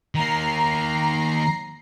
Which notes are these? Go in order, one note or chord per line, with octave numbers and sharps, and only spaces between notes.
D#3 A#3 A#5 C7